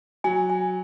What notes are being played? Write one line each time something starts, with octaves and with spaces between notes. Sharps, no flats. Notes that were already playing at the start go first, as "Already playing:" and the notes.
F#3 G#5
G#5